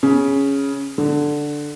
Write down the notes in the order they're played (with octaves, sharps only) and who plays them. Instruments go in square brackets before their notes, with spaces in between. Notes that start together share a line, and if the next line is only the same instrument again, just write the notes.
[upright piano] C#3
D3